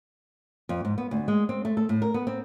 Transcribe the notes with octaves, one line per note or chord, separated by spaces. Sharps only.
F2
G#2
B3
D2
G#3
C4
A3
A4
A2
A#4
B3
C4